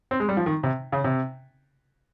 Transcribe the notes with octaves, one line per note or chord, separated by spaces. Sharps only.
C4
G#3
G3
F3
D#3
C3
C#3
C3